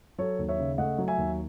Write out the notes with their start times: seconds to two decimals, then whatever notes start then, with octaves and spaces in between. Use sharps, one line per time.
0.18 F#3 A4 C#5
0.39 D#2
0.48 C#5 E5
0.59 C#3
0.78 A3 D#5 F#5
0.98 F#3
1.08 E5 G#5
1.18 D#2